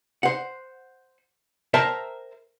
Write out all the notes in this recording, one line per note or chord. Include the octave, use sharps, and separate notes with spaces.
C5 F#5
A#4 C5 E5 G5 A5 A#5